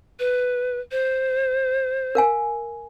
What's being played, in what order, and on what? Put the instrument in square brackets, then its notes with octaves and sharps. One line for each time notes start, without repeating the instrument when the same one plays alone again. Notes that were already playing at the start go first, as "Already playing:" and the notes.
[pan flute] B4
C5
[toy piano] A#4 F5 G#5